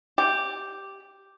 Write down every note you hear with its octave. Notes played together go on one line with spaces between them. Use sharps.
G4